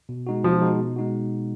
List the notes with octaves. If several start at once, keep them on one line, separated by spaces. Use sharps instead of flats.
B2
G#3 D#4 F#4
B2 F3
G#3 D#4 F#4
B2
G#3 D#4 F#4